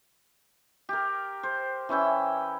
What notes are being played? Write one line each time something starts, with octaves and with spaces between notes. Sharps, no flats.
G4 A#4
C5
E3 C#4 E4 G5